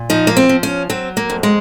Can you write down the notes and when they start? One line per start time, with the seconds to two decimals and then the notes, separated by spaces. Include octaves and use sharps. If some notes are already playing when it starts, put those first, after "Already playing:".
Already playing: A#2
0.10 F3 D#4
0.27 A#3
0.37 C4
0.49 F3
0.63 C#4
0.90 F#3 C4
1.17 A#3
1.30 F2
1.43 G#3